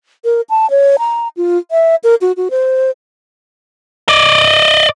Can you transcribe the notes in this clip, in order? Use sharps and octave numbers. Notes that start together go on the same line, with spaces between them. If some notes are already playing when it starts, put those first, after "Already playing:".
A#4
A5
C#5
A#5
F4
E5
A#4
F#4
F#4
C5
D5 D#5